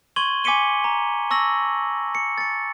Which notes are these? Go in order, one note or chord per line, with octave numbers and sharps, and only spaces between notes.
C6 C#6 G#6 D#7 F#7 G7
G#5 D6 B6 C#7 D#7 G7
A#5
A5 C#6 E6 A#6 F#7
C#7
A6 C#7